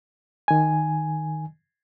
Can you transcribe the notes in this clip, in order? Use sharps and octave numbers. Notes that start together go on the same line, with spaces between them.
D#3 G#5